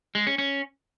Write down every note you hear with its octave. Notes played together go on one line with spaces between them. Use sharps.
G#3
C#4
C#4